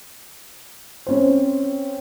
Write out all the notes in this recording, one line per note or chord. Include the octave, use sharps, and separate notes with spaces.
C4 C#4 C5